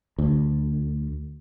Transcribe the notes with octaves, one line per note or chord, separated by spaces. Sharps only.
D2